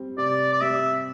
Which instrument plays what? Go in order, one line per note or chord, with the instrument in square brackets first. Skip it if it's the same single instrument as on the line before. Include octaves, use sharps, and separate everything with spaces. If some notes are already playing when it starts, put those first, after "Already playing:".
Already playing: [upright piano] G3 C4
[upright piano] C3 [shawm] D5
[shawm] D5
[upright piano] G3 C4 [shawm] E5